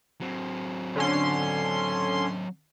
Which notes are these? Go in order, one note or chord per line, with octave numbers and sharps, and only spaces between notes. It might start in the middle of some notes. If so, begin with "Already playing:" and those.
F#3 C4
D3 C#4 C6